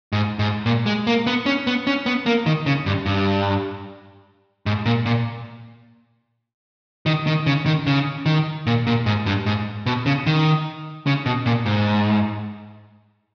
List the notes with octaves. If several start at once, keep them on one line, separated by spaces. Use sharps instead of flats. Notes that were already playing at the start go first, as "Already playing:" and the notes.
G#2
G#2
A#2
G#3
A#3
B3
C#4
B3
C#4
B3
A#3
D#3
C#3
G2
G2
G#2
A#2
A#2
D#3
D#3
C#3
D#3
C#3
D#3
A#2
A#2
G#2
G2
G#2
B2
C#3
D#3
C#3
B2
A#2
G#2